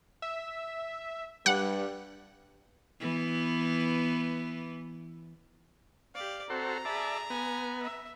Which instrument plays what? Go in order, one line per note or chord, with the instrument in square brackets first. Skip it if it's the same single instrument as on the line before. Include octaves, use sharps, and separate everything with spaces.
[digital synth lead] E5
[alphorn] G2 [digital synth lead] G3 [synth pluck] F#5
[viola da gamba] E3 B3
[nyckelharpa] G4 D5 [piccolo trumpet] F5
[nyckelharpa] C4 [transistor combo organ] F#4 A4 C5 [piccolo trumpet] A#5
[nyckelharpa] G#4 B5 [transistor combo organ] D5 E5 A5
[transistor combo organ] B3 [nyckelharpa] G#5
[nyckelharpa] E5